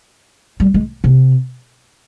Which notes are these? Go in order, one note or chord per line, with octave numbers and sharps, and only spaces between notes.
G3
G#3
C3